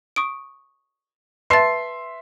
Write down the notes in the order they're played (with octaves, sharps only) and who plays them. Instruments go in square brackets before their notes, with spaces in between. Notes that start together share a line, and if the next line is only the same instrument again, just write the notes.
[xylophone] C#6 D#6 D7
[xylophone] B4 A5 A6 [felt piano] E5 C6 C7